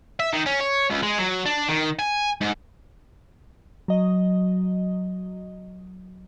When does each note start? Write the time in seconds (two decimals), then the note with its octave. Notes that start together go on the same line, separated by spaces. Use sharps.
0.20 E5
0.33 D#3
0.46 C#4
0.61 C#5
0.90 C#2
1.02 G#3
1.18 F#3
1.45 D4
1.69 D#3
1.99 G#5
2.41 G#2
3.88 F#3 D#5